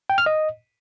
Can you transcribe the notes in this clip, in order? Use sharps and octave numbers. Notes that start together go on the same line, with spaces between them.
G5
F6
D#5